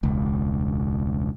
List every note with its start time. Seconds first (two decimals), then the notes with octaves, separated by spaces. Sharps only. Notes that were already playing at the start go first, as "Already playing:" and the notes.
0.03 E1 C#2